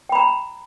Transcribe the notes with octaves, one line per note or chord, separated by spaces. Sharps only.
G5 A#5 B5